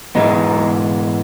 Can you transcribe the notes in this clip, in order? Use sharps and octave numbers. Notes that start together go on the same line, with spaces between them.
G#2 E3 G#3 B3 D#4